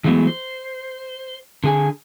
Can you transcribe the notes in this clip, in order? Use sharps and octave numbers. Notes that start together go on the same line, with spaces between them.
E3 F#3 G#3 A3 B3
C5
D3 G#4 G#5